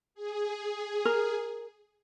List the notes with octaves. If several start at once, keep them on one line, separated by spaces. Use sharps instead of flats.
G#4
A#4